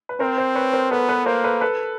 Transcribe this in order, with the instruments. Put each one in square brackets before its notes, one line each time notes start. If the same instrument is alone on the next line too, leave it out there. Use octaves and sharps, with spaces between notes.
[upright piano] B4
[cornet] C4 [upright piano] A#4 C5
[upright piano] A#4 C5
B4 C#5
A#4 C5
[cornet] B3 [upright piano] A4 B4
[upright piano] A4 B4
[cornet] A#3 [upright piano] A#4 C5
[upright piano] A4 B4
A4 B4